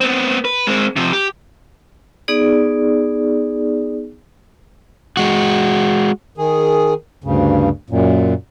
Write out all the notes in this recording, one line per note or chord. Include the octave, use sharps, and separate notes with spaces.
B3 C4
B4
G#3 C4
C3 F3
G4
B3 D#4 G#4 D5
G#3 F#4
D#3 G#4
D2 G2 C#3
F#2 A#2